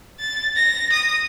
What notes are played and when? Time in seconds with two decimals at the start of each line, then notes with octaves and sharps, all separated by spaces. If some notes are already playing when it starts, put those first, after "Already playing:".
0.20 A6
0.56 A#6
0.93 D#6